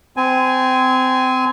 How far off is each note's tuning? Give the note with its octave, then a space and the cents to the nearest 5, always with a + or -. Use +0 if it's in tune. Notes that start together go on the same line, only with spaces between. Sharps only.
C4 -20 G#5 +0